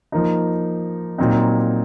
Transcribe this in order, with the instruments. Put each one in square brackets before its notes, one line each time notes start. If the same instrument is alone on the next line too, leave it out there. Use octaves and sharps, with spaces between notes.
[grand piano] F3 A#3 D#4
A#2 F#3 C4 D#4